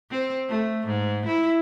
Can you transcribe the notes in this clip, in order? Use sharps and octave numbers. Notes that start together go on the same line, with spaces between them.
C4
A3
G#2
E4